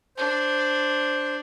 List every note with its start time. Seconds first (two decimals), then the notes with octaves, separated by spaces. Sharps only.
0.17 D4 C5